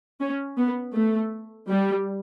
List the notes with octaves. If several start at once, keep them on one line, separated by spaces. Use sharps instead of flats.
C#4
B3
A3
G3